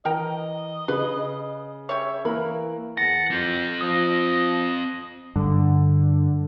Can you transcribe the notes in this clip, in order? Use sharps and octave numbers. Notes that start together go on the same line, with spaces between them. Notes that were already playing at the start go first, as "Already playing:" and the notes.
E3 A#4 D#5 G5 A#5
C#3 B4
G3 C#5 E5
E3 A#3 A#4 B5
E2 F#5 A5 A#6
F2 C4 F4 G4
F3 D#5 D#6
G2 D3